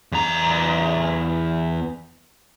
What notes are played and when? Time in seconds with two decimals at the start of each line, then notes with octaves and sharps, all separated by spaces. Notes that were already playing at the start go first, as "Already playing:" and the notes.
0.12 E2 A#5